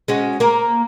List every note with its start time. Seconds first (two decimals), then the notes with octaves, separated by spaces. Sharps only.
0.08 G#3 C#4 F#4
0.40 A#3 A#4